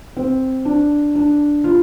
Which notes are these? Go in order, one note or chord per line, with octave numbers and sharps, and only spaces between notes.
C4
D4
D4
F4